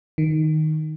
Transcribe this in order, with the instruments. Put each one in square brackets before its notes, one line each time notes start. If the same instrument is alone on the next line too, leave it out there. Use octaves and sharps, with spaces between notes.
[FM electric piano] D#3